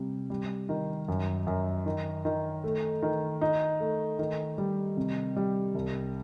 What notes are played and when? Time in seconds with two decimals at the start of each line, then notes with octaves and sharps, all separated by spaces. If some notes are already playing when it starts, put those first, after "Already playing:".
Already playing: C3 G3
0.30 G3
0.69 D#3
1.08 F#2
1.47 F#2
1.86 D#3
2.25 D#3
2.64 A3
3.03 D#3
3.41 D#4
3.80 A3
4.19 D#3
4.58 G3
4.97 C3
5.36 G3
5.75 C2